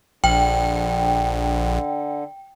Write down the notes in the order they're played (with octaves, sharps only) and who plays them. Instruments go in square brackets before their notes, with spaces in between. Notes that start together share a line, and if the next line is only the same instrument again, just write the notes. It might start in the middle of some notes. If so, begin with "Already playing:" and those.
[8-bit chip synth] A#1 [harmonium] D3 [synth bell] G5